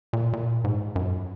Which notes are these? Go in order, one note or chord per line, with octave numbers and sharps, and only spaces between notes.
A#2
A#2
G#2
F#2